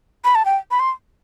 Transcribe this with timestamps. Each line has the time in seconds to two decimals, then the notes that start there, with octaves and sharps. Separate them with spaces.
0.25 B5
0.35 A5
0.45 G5
0.71 B5
0.80 C6